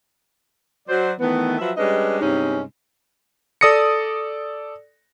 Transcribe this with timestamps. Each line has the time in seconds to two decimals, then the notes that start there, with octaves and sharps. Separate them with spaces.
0.88 F#3 C5 D5
1.20 D#3 E3 A3 B3
1.59 F3 F#3 B4 E5
1.77 G3 G#3 C#4 D4 B4 D#5
2.20 G2 C3 G#3 C#4 D#4
3.61 A4 D5 D#6 A#6 C#7